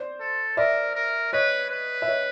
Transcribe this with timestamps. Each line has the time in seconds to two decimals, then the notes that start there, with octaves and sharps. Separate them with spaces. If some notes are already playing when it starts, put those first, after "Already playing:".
Already playing: C5 D5
0.20 A4
0.57 A#4 D5 E5
0.96 A#4
1.33 B4 C#5 D#5
1.71 B4
2.02 E5
2.08 C#5 D#5